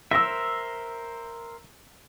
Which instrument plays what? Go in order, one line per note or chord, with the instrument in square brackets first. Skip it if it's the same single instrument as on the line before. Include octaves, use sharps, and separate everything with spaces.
[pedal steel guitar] A#4 C5 E5 [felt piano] E6 A#6